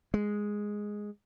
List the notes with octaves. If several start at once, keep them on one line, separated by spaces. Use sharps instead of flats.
G#3